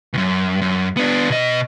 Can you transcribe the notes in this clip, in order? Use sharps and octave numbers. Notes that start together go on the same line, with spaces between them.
C#2 F#2
F#2
B3 D4
B2 D#5